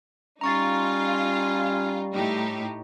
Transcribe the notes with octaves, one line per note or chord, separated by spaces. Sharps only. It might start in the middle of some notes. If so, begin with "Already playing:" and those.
G3 C#4 D#4 F4 A#5 C#6 A6
A2 D#4 G4